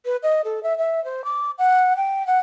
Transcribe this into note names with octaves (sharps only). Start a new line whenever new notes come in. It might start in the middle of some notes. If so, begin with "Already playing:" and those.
B4
D#5
A4
E5
E5
C5
D6
F#5
G5
F#5